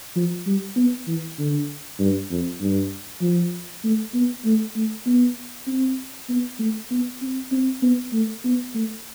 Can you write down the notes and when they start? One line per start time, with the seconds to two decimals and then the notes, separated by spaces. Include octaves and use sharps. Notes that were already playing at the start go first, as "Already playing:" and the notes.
0.16 F3
0.46 G3
0.76 B3
1.07 E3
1.38 D3
1.99 G2
2.30 F2
2.61 G2
3.21 F3
3.84 A3
4.14 B3
4.45 A3
4.75 A3
5.06 B3
5.67 C4
6.29 B3
6.59 A3
6.91 B3
7.21 C4
7.52 C4
7.82 B3
8.13 A3
8.44 B3
8.75 A3